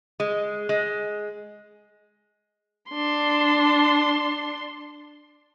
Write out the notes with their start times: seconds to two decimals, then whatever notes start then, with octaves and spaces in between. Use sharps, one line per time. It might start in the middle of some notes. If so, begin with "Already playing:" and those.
0.20 G#3
0.69 G#3
2.90 D4 C6